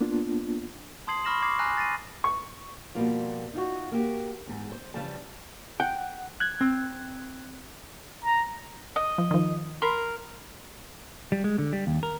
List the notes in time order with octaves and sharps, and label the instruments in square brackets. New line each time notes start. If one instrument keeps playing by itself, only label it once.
[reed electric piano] A#3 B3 D4 F4
[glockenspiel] A5 C6 D#6 G#6 C7 F#7
B5 C#6 F6 A#6 E7 F#7
C#6 D6 G#6 C7
G#5 A#5 F6 F#6 A#6 C7
A6 A#6 C7 D#7
[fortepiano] C#6
[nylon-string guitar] B2 F3 G3 A#3 F4
D#4 F4 F#4
A#3 F#4 G4
E2 G#2
C5
C#3 E3 F3 G3 A5
[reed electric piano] F#5 [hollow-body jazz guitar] G5
[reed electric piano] F#6 G#6
[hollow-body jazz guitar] C4
[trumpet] A#5
[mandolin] D#5
[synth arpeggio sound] F3
D#3 F3
[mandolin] A#4 [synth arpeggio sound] B5 C6
[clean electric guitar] G3
G#3
D3
G3
D#2
A#4